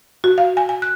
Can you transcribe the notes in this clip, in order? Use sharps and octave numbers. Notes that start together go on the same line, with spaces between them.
F#4
F5
G#5
G#5
F#6